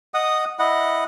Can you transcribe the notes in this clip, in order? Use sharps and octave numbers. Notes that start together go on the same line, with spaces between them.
D#5 F#5 D#6
E4 D#5 F#5